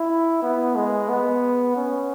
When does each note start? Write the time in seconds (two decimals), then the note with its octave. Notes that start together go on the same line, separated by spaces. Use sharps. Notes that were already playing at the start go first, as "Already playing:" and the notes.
Already playing: E4
0.42 B3
0.76 G#3
1.09 B3
1.76 C#4